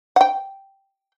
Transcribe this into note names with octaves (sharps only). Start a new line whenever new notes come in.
F#5 G5